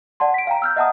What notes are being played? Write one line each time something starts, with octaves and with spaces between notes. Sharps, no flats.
D5 F#5 A5 C6
B6 D7
F5 G5 A#5
E6 F6 G6
D#5 E5 F#5 A5 A#5 D#6